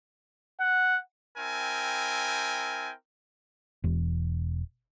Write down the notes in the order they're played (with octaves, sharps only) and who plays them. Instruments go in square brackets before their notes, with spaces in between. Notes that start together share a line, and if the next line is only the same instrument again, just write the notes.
[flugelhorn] F#5
[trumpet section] C4 E4 A#4 G5 G#5
[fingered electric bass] E1